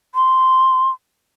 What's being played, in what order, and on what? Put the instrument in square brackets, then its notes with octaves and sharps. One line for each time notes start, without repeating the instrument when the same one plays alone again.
[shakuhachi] C6